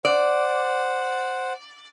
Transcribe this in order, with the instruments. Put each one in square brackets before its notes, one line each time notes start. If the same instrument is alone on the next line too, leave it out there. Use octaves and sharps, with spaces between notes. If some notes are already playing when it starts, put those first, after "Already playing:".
[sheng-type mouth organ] C5 F#5 [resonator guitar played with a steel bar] D5